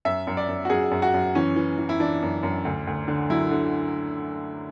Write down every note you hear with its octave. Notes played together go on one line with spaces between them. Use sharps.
F#2 E5
F#2
D5
F#2
F#4
F#2 G#4
F#2
F#4
F#2
E3 C#4
E3
E3
E4
E3 D4
F#2
F#2
D2
D2
D3
F#3 E4
D3